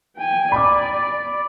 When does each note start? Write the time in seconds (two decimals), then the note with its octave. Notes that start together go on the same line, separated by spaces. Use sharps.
0.17 G5 G#5
0.52 D5 B5 D6